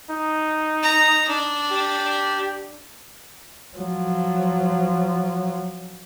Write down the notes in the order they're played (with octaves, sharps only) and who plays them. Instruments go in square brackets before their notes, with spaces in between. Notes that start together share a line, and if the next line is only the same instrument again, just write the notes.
[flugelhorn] D#4
[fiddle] A#5
D4
[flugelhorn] G4
[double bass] F3 F#3